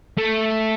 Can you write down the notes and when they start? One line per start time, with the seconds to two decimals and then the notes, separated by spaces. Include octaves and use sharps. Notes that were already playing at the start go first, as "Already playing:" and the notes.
0.18 A3